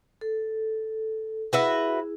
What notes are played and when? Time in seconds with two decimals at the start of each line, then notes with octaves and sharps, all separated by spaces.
0.21 A4
1.53 E4 F#4 G#4 B4 E5